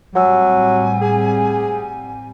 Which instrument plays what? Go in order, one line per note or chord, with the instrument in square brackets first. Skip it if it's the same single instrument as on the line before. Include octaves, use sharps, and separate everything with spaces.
[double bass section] A2 G3 C4 [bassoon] F#3 [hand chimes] F#5 E6 [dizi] G#5
[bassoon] G#4